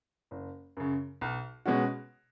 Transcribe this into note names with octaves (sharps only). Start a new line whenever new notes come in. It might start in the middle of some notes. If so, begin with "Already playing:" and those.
F#1
F#2 C#3
B1
B2 G#3 C#4 F#4